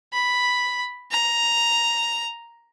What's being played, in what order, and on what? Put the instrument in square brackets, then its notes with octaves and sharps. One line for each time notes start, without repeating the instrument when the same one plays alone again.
[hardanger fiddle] B5
A#5